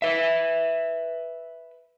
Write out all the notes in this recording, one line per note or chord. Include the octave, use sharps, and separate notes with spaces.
B4 E5